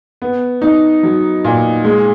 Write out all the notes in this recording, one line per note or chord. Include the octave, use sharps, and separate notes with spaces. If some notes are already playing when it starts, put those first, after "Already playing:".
B3
D#4
F#3
A#2
G#3